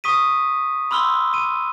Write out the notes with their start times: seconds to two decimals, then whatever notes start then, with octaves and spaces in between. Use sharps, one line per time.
0.04 C#6 D#6 B6 D#7
0.91 B5 C6 E6 F6 G7
1.34 D#7